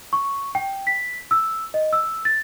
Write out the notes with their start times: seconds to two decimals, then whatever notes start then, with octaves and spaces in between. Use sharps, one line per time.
0.13 C#6
0.55 G5
0.87 B6
1.31 E6
1.74 D#5
1.93 E6
2.25 A6